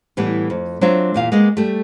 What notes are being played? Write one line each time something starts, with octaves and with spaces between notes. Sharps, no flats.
A2 E3 G3 B3
F2
F#3 C4 D4 F4 E5
E2 A#2 F5
G#3 A#3 B3 D#5
G3 A3